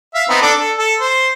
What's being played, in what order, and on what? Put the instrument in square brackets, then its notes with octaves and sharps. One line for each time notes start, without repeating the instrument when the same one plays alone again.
[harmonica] E5 F5
B3 C4 D#4
D4 A4 D5
A4
A4
C5